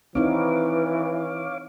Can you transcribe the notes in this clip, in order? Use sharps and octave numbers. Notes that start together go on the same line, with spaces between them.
E3 C4 D#4 E4 B4 C#5 F5 D6